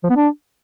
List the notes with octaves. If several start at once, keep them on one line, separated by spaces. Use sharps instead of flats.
F3
B3
D4